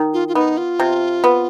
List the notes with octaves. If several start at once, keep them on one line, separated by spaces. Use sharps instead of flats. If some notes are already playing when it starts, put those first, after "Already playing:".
Already playing: D#3
F4
F4
B3 D#4
F4
C3
B3